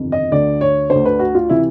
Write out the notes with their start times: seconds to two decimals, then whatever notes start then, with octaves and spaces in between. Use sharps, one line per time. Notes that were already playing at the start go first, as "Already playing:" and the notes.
Already playing: G1 F2 C3 D#3
0.12 D#5
0.32 D2 D3 D5
0.61 C#5
0.90 D3 C5
0.95 D2
1.05 B4
1.19 F#4
1.35 F4
1.49 C3 E3 E4